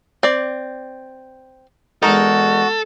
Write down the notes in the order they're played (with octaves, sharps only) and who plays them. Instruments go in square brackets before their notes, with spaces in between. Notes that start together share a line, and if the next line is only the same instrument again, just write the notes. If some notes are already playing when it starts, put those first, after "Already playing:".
[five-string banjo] C4 D5
[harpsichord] E2 G#3 A#4 [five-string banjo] D#4 [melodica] F#4 [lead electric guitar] A4